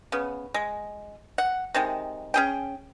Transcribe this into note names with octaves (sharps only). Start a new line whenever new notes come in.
C#3 B3
G#3
F#5
C3 D#3 G#3
C#4 G#4 G5